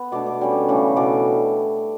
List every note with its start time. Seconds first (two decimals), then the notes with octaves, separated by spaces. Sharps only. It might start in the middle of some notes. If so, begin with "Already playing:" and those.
Already playing: B3
0.12 B2 A3 D4 D6
0.26 D6
0.41 B2 G3 C#4
0.68 C#3 E3 A3 D4
0.96 B2 D6